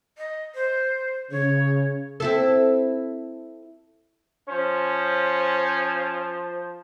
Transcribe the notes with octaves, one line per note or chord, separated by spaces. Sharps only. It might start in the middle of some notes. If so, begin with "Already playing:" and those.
D#5
C5
C#3 C#5
C4 E4 A4
F3 C#4 C5